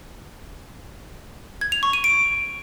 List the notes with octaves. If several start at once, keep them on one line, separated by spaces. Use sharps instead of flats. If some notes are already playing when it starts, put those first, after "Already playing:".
G#6
F7
C#6
D#7
D7